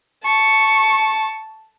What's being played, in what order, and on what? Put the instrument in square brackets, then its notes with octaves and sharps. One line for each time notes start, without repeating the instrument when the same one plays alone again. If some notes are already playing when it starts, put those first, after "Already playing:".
[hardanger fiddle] A5 [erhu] C#6